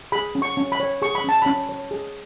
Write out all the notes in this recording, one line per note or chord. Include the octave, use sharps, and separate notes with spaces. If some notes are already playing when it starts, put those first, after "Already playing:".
G#4 B5
C#4
C#6
C#4
B5
C#5
G#4 C#6
B5
C#4 A5
C#4 B5
C#5
G#4